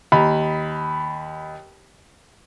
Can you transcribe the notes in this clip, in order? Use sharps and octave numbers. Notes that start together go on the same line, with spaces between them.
D#2 A#5 B5